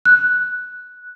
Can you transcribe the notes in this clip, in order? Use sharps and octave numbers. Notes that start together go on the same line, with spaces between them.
F#6